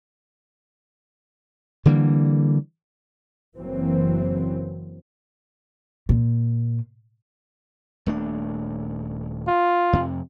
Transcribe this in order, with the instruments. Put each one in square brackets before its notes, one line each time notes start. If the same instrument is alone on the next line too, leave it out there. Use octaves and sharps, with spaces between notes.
[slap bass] D3 E3 G3 A#3
[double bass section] F#1 E3 F#3 A#3 C4
[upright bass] A#2
[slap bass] D#1 A3 D4
[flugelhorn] F4
[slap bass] F2 C3